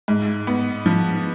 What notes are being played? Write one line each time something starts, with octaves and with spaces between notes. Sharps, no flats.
G#2
B3
F3